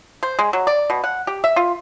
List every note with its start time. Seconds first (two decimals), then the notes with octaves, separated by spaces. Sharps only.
0.23 C5
0.39 G#3
0.53 F#3
0.67 D5
0.90 B2
1.04 F#5
1.27 G4
1.44 E5
1.56 F4